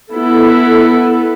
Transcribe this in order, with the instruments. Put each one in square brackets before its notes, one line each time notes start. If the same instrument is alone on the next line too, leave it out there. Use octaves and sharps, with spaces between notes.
[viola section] B3 E4 A4